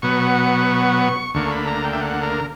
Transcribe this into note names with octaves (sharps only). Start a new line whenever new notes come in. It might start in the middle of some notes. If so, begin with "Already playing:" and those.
B2 F#3 B3 C#6
D2 D3 A#3 C#6
B5
A#5
G5
E5
F#5
A#4